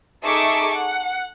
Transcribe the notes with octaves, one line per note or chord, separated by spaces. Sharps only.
D#4 G#4 A4 E5 C#6 D6
F#5